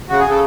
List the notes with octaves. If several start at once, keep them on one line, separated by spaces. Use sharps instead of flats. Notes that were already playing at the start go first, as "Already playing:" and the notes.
C#3 F#4
C#3 G#4
A4